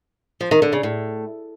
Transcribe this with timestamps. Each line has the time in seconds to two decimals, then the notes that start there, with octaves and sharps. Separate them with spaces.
0.41 F3
0.51 D#3
0.62 D3
0.73 C#3
0.83 A2